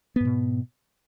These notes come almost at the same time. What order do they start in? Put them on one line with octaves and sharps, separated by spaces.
B3 G#2 B2